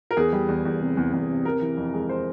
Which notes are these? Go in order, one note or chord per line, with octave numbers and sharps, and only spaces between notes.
A#4
E2 G#4
G3
E2
E2
C3
E2
E2
C3
C3 A#4
E3
F2
G#3
C5